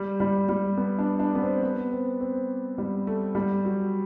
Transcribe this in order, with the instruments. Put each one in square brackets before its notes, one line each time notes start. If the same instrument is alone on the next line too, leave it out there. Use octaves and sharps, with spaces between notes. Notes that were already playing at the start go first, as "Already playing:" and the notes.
Already playing: [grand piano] G3
G3
G3
B3
D4
D4
B3
C4
B3
C4
C4
G3
A3
G3
F#3